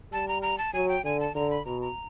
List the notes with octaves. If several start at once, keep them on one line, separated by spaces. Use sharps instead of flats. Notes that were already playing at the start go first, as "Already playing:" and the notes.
G3 A5
A#5
A#5
A5
F#3 G#5
G5
D3 G#5
A5
D3 A#5
B5
B2 A#5
A#5